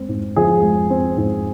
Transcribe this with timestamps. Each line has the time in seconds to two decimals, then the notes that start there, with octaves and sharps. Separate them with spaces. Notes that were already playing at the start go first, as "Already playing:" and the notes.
Already playing: G#3 C4
0.08 G#2
0.36 F3 G#4
0.63 G#3
0.90 C4
1.17 G#2